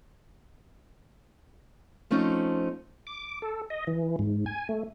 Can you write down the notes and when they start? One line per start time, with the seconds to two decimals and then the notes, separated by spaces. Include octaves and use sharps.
2.10 F3 A3 C4 C#4 D#4
3.07 D6
3.42 A4
3.70 D#5
3.87 E3
4.19 G#2
4.46 G#5
4.69 A3